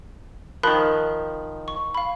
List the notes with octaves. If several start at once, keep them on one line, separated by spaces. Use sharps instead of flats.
D#3 F3 A#4 B5 F#6
C#6
F5 B5